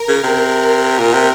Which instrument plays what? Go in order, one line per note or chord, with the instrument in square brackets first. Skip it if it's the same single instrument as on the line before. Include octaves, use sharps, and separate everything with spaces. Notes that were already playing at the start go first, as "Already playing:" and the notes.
Already playing: [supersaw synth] A#4
[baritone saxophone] C#3
C3
A#2
C3